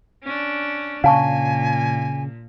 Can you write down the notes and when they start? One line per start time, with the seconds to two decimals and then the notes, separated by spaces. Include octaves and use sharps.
0.24 C#4 D4
1.04 A#2 C#3 F5 G#5 A5 C#6